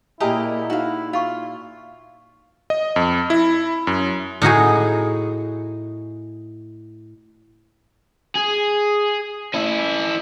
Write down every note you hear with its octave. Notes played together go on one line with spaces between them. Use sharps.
A#2 E4 G4 G#4 A#4 D#5
D#4 F#4 F5
F4 F5 C#6
D#5
F2
E4
F#2
A2 D#4 F#4 G#4
G#4
C#4 E4